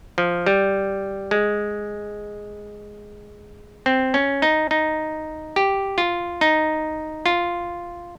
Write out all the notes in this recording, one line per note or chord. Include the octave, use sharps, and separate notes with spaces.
F3
G3
G#3
C4
C#4
D#4
D#4
G4
F4
D#4
F4